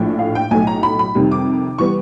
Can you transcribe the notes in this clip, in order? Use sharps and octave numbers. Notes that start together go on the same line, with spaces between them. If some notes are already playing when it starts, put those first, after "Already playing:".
Already playing: A#1 A2 F3 A3 D4
F5
G5
B1 A2 F#3 A3 G#5
A#5
B5
B5
F2 C3 D#3 G3
D6
E3 G3 B3 C#6